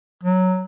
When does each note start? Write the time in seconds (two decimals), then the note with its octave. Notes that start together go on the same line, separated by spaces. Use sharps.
0.23 F#3